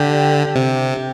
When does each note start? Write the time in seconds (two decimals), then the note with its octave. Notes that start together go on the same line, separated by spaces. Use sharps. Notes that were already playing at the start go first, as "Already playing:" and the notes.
Already playing: D3 G4
0.56 C3